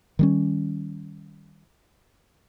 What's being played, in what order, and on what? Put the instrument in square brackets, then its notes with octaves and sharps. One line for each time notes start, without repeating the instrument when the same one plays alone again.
[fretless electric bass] D#3 G3 C#4